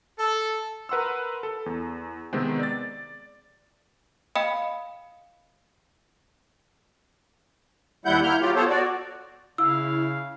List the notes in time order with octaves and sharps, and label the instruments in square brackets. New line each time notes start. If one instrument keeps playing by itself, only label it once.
[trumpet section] A4
[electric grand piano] A#4 B4 F#5 C6 E6
A4
E2
C3 D#3 G#3 B3 C4
D5 A6
[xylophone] D#5 F5 G5 B5 D#6 C#7
[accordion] D#2 G3 E4 F#5 G6
A#3 E4 F6 G6
F#3 F4 G4
B3 A4 C5 C#5
F#4 D5
[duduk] C#3 [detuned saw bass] E4 [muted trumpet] F5 [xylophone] E6